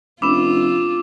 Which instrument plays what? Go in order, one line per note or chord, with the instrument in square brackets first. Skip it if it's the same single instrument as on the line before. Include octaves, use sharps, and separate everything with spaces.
[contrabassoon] F1 [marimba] C#4 D4 B5 [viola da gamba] F4 [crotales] D6 E6 E7